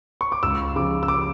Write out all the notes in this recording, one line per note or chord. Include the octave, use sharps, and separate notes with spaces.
C#6
D6
C#2 E6
C#3 F3 D6
E6
D6